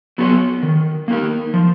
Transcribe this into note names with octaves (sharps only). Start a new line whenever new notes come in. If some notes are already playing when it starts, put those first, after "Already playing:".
F#3 B3 F#4 C#5
D#3
A#3 D#4 A#4
F3